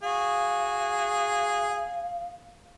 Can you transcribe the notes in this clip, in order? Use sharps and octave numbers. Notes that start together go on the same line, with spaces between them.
F#4 G#4 F5